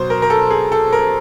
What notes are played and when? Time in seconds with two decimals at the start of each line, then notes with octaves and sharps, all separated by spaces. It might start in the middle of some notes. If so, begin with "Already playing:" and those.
Already playing: B2 F#3 C5
0.10 A#4
0.22 A#4
0.30 A4
0.51 G#4
0.72 A4
0.93 A#4